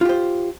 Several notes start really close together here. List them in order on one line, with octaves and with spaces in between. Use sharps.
F4 G4 C5